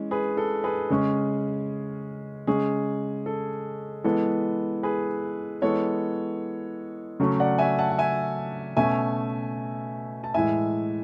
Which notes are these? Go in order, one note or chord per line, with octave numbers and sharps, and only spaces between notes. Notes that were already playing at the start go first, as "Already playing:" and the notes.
Already playing: E3 G#3 C#4
G#4 B4
A4
G#4 B4
C#3 G#3 C#4 G#4
C#3 G#3 C#4 G#4
A4
E3 G#3 B3 A4
G#4 B4
E3 G#3 B3 A4 C#5
C#3 F#3 A3 C#4
D5 F#5
E5 G#5
F#5 A5
F#5
E5 G#5
B2 A3 C#4 E5 G#5
A5
A2 E3 G#3 E5 G#5